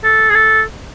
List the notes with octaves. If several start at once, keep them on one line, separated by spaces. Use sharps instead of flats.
A4
G#4
A4